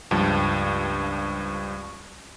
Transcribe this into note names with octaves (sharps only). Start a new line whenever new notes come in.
C#2 G2 F3 A5